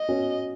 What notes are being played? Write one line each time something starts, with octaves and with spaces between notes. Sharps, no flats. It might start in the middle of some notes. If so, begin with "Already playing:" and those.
Already playing: D#5
C#4 F#4